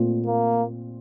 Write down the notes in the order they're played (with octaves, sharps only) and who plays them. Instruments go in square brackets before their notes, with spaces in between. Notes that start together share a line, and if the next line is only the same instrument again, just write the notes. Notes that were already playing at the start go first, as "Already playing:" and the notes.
Already playing: [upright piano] A#2 A3 C4 F4
[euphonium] A#3